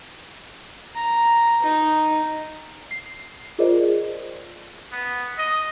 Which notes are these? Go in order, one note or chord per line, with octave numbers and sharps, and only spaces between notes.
A#5
D#4
C7
F4 G#4 A#4 C5 D5 D#5
B3
D#5